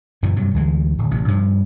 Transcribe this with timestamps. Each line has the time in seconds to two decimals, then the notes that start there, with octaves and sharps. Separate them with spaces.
0.22 F#1 F#2 A#2 E3
0.36 G2 C3 F#3
0.54 D2 E3 G#3
0.98 D1
1.11 A1 C3
1.28 G2 F3